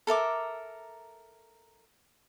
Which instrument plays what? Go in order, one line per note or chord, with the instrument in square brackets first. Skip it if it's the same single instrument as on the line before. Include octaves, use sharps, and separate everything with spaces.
[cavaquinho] A4 A#4 E5 D6